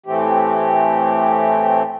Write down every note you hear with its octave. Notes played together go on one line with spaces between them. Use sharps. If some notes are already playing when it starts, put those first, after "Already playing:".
A2 E3 A3 C4 G4